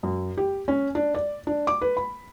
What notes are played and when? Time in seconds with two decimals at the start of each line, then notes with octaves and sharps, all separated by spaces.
0.03 F#2
0.38 G4
0.68 C#4
0.95 D4
1.15 D5
1.47 D4
1.67 D6
1.81 B4
1.97 B5